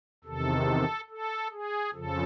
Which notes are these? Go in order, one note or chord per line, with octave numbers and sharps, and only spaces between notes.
E2 C3 D#3 A4
A4
G#4
F2 C#3 F3 A4